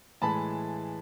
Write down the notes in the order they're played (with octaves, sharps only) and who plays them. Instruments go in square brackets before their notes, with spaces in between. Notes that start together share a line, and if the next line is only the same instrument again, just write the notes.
[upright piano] A2 E3 G#3 A5 B5